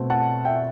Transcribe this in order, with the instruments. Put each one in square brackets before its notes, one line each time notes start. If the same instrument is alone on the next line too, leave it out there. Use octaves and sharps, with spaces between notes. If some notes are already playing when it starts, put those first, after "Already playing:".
Already playing: [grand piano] B2 A3 C4
F#5 A5
E5 G5